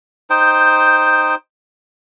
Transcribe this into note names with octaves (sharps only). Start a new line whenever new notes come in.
D#4 C5 G5